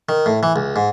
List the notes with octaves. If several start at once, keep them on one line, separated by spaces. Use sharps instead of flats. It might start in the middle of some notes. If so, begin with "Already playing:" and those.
D#3
A2
E3
C#2
G#2